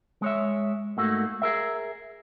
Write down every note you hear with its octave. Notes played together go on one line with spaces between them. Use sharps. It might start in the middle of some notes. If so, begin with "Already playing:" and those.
G#3 C#5 E5
G#2 A3 A#3 F#4
G#4 A#4 E5